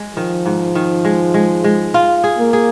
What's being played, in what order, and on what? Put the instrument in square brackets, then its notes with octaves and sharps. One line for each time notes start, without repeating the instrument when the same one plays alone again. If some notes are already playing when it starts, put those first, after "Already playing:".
Already playing: [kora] G#3
[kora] D#3 [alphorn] F3
[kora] G#2
D#3
G#3
G#3
G#3
F4
G#4
[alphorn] A#3
[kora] G#4